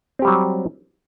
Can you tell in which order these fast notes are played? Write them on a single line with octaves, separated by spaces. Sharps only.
C4 G4 G3 F#3